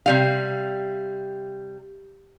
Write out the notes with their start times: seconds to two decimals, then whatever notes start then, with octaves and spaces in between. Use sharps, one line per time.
0.06 C3 G3 F5